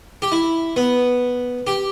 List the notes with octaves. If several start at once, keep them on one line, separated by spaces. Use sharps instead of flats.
G4
E4
B3
G4